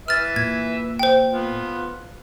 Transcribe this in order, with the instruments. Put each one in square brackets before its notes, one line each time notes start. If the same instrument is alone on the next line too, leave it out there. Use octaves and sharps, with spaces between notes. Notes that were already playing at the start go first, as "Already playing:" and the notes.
[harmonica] B4 E5 [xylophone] F6 A6
[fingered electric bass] A#2 [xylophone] G#6
[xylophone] C5 G5
[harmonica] B3 F4